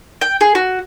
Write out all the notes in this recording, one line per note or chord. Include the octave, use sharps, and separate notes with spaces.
G5
G#4
F#4